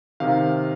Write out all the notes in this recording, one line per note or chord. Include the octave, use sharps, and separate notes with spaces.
C3 D#3 F5